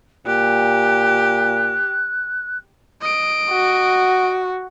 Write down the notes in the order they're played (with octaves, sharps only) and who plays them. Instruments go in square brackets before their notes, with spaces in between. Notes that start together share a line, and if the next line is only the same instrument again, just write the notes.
[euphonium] A#2 [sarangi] G4 [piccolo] F#6
[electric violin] D#5 D7
[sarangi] F#4